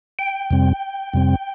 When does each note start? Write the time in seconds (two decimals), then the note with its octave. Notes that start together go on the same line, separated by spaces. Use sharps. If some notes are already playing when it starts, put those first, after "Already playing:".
0.19 G5
0.51 F2 C3 G3 C4
1.14 F2 C3 G3 C4